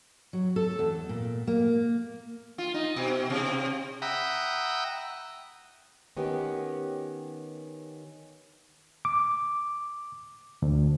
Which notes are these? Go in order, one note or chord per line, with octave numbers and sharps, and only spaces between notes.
F#3
A4
E2
A#2
A#3
F4
D#4
B2
C3
E5 F#5 G5 A#5 B5 D#6
D#3 B3 C#4 G4
D6
D2